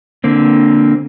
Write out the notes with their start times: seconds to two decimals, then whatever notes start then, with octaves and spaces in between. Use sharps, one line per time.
0.24 D3 A#3 C4